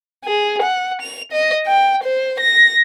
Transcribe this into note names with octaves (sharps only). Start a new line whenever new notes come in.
G#4
F#5
F7
D#5
G5
C5
A#6